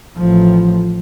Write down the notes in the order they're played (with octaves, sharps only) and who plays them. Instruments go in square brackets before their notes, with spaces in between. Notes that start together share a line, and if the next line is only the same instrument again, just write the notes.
[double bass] A1 F3